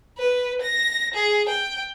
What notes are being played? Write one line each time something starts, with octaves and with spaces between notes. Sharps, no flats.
B4
A#6
G#4
G5